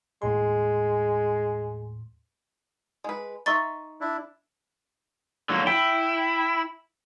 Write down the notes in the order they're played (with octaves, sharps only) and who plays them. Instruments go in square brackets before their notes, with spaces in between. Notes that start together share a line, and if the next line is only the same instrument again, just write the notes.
[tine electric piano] D#2 A2 C6 [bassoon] G#3
[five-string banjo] G#3 B4
[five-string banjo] D#4 E5 [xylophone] C6 C#6 A6
[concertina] D4 E4
[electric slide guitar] D3 F#3 A#3
[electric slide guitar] E4 [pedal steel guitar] G5